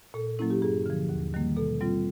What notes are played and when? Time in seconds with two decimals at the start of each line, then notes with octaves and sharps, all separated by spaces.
0.14 A#2 A4
0.39 F#3 A#3 C#4 E4
0.50 G4
0.62 G2 G#4
0.86 D3 F3
1.09 D#2
1.34 D#3 G3 A#3
1.56 B2 A4
1.81 G3 C4 F4